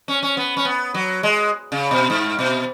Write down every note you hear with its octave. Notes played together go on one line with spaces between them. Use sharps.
C#4
C#4
B3
C#4
B3
F#3
G#3
C#3
B2
G#2
B2